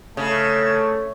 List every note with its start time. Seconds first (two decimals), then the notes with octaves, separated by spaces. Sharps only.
0.17 C#3 A3